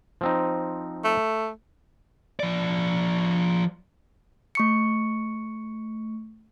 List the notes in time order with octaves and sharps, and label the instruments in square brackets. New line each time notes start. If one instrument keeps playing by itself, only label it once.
[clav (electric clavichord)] F3 C4 D#4
[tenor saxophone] A3
[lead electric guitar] F3 D5
[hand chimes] A3 C#6 C#7